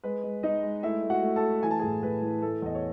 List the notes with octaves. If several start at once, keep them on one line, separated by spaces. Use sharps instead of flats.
G#3 B4
G#3
G#3 D#4 D#5
G#3
A3 E4 E5
A3
F#4 F#5
A3
A4 A5
A3
E3 G#5
A5
A2 G#4 G#5
A2 B4
E3
A3 A4
E2 D#5
C#5